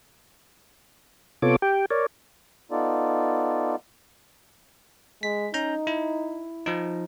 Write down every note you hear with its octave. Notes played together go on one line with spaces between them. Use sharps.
C3 B3 F4 A4 C#5 D6
G4 G5
A#4 C#5 D5
B3 D#4 F4 A4 D5
G#3 B6
C#4 D#4 A#5 G6
E4
F3 D#4